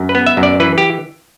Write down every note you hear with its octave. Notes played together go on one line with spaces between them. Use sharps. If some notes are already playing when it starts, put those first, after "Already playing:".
Already playing: F#2
B4
B3
E5
F#2
D5
E3 B4
G4